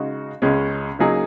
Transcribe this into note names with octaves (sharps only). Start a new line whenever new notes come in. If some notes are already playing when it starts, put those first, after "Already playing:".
Already playing: C#3 G#3 D#4 F#4
C#2 C#3 G#3 C#4
C#3 F#3 A#3 D#4 G#4